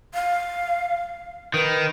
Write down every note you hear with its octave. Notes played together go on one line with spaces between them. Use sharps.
F5
D#3 B4